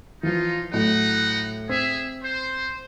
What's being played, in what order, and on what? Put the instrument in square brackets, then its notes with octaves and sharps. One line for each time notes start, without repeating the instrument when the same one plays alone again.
[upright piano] E3 F3 [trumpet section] D#4 F4
[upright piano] A2 F#3 [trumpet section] D#4 F#5
[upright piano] C4 [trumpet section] G#4 E5
[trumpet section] C5